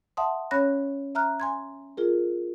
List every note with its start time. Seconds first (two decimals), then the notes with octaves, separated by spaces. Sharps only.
0.17 E5 F#5 A5 C6 D#6
0.51 C#4 C#5 B5 F#6 A#6
1.15 E5 A#5 F6 F#6
1.40 G#5 C6 G#6
1.97 F4 G#4 A#4